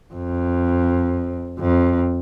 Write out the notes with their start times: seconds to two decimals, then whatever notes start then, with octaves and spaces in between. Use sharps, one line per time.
0.14 F2
1.59 F2